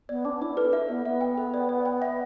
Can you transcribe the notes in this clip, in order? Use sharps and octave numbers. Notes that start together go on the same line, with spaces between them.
B3 D5
D4 D6
E4 D5
A4 B4
E5
B3 B4
B3 E5
G5
A4
D5
D5
G5
E5